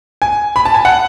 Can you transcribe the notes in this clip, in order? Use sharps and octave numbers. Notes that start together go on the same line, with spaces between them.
G#5
B5
A5
G#5
F#5